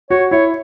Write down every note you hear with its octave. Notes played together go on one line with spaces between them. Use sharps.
F#4 C#5
E4 C#5